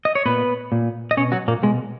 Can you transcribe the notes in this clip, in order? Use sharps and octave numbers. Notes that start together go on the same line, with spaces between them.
D#5
C#5
A#2 B3 B4
A#2
D#5
B2 C#4 C#5
F#3 F#4
A#2 A#3
B2 G#3